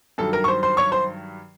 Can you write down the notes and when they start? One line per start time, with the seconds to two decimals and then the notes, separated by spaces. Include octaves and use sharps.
0.18 G2 D#3 F#3 A4 A5
0.33 A#4 A#5
0.44 C#6
0.48 C5 C6
0.63 C5 C6
0.77 C#5 C#6
0.92 C5 C6